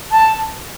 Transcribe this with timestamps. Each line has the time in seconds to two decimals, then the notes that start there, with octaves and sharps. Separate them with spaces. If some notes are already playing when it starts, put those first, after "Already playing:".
0.11 A5